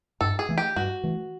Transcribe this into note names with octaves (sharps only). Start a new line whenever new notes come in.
G2 A4
G#4
E3 A3
G4
G2 F#4
E3 A3